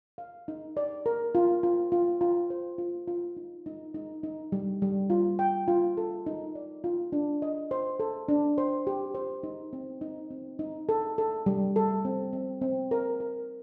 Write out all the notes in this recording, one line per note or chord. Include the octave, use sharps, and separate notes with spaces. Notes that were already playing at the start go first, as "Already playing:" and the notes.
F5
D#4
D5
A#4
F4
F4
F4
F4
C5
F4
F4
D#4
D#4
D#4
D#4
G3
G3
F4
G5
F4
A4
D#4
D5
F4
D4
D#5
C5
A4
D4
C5
G4
C5
D#4
C4
D#4
C4
D#4
A4
A4
G3
A4
C4
C4
C4
A#4
A#4